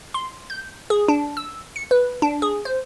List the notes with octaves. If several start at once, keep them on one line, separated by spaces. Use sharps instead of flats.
C6
G6
G#4
D4
E6
C#7
B4
D4
G#4
C5